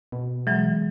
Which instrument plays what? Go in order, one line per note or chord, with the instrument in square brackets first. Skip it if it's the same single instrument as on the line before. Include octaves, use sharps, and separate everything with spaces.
[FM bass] B2
[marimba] E3 F#3 [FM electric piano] G#3